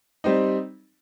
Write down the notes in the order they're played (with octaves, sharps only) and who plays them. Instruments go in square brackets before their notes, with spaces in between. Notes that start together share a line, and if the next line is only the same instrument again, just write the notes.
[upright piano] G3 C4 D#4